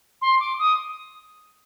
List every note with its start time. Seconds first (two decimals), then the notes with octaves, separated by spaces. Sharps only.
0.22 C6
0.40 D6
0.59 D#6